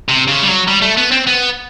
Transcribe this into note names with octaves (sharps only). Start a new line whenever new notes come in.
C3
C#3
G3
F#3
G3
A3
B3
C4
B3